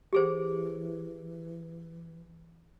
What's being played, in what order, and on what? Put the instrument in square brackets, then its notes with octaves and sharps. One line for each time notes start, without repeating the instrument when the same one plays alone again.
[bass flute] E3 [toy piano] G4 G#4 C5